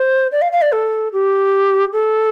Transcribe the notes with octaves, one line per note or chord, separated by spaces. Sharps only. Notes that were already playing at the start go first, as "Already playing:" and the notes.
Already playing: C5
D5
F5
F5
D5
A4
G4
A4